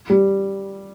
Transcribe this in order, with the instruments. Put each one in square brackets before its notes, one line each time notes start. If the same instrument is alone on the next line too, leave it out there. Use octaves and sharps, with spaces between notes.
[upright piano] G3